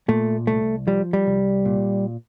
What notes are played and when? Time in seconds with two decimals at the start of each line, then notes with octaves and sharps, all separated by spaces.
0.08 A#2 A3
0.47 C2 A3
0.87 F3 G3
1.13 G3
1.27 C2
1.65 A#2